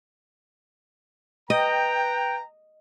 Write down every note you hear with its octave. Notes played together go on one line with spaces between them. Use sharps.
B4 D#5 G5 A#5